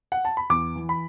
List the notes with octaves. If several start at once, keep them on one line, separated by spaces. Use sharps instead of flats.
F#5
A5
B5
E2 D6
E3
B5